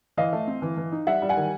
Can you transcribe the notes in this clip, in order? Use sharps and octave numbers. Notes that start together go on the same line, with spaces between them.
E3 D#5 F5
A3
C4
E3
E3
D#4
G3 E5 F#5
G3
F#5 G#5
D#3